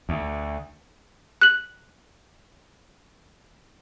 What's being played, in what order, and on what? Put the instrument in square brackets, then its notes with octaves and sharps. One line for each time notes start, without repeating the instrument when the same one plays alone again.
[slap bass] D2
[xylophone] F#6 F#7